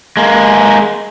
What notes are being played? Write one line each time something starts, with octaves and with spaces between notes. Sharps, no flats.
G#3 A#3